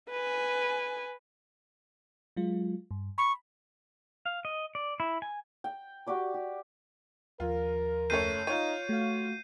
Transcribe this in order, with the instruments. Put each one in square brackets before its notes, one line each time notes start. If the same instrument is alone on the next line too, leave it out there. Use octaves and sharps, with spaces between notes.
[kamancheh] B4 G#5
[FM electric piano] F#3 G#3 F4
G2
[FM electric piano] B5 [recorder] C#6
[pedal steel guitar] F5
D#5
D5
E4
G#5
[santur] G5
F#4 G4 D5 D6
G4
[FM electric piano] D#2 F3 [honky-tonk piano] F4 [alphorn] A#4
[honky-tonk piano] F#1 A3 C#5 [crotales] G6 C7 D#7
[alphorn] D#4 [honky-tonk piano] F4 C#5 [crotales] G6 D#7
[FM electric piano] A3 F5 [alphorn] F#4